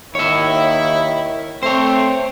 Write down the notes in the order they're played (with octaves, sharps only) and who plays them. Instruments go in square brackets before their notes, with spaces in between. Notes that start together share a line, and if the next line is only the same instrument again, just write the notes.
[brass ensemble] D#2 D#3 E4 [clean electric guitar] C#5 E5
[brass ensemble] A3 C4 [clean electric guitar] C5 C#5